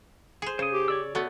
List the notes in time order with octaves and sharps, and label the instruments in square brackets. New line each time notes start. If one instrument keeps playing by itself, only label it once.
[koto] G#4 C5
[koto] C#3 [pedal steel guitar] C5 D#6
[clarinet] G4
[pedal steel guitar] C#5 D5 E6
[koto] A3 B3 [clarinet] F#4